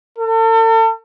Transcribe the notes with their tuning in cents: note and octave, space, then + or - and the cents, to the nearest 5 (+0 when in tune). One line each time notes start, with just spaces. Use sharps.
A4 +40